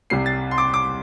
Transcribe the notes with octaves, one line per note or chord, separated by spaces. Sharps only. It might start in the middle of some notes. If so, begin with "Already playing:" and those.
C2 C3 G3 C7
A6
C6
D6
D6